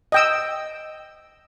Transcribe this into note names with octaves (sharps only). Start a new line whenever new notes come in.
D#5 G5 E6